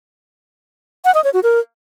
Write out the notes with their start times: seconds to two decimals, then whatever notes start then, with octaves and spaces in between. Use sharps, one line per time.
1.05 F#5
1.15 D#5
1.24 C#5
1.34 F#4
1.43 A#4